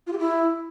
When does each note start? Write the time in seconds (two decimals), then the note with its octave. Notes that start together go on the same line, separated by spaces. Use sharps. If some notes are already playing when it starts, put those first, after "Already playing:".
0.07 F4
0.12 G4
0.18 E4